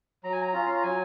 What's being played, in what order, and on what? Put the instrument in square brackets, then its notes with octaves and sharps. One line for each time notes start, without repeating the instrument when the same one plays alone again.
[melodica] F#3 A#5
G#5
A#5
C#4 F4
C6
A#5
F#3 G#5